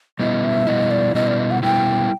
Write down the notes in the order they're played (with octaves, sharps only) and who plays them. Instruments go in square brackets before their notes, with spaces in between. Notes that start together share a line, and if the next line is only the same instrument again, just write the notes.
[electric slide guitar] B2 G3 B3 E4 [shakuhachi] D#5
[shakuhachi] E5
[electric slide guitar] B2 G3 B3 E4 [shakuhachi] D#5
[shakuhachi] D5
[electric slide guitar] B2 G3 B3 E4 [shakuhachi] D#5
[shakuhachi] D5
D#5
F#5
[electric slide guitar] B2 G3 B3 E4 [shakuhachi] G5